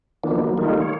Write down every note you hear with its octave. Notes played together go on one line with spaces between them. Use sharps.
D#3 F3 A#3 B3 D4
F#3 A#3
D#3 G3 A3 A#3 D#4 F4
C#5